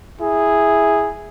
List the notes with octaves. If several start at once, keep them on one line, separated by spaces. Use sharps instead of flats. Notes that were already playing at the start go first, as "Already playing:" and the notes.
E4 G#4